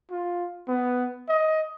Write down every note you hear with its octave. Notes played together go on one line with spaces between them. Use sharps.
F4
B3
D#5